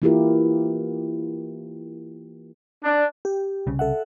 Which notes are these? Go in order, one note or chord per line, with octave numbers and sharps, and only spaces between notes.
E3 A#3 E4 F4 G4 A#4
D4
G4
C2 C#3
A4 E5 F#5